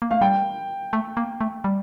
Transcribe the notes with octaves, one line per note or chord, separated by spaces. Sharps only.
A#3
A3 F5
G3 G5
A3
A#3
A3
G3